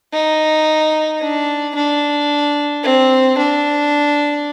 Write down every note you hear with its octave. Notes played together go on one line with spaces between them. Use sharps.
D#4
D4
D4
C4
D4